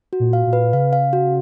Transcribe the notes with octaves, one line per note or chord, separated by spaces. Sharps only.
F#4
A#2
F5
A#2
B4
C#3 F5
F5
F#4